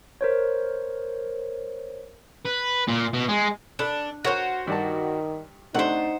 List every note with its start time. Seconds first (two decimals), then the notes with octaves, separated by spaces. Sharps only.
0.21 A#4 C5 C#5
2.46 B4
2.88 A#2
3.14 B2
3.29 G#3
3.79 D4 A4 B5
4.24 F#4 A#4 C5 C#5 F#5
4.67 G2 D#3 D5 A5
5.75 C3 A3 D4 D#4 C5 F#5